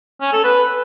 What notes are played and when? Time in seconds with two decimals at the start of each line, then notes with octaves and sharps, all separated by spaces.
0.21 C#4
0.33 A4
0.44 B4